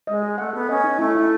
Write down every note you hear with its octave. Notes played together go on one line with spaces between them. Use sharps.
G#3 D#5
G#4
A3 F#5
B3 A4
C#4 D#5
D#4
A3 E4
E4